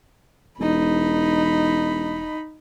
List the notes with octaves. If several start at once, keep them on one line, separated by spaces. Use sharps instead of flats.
E1 D#4 B5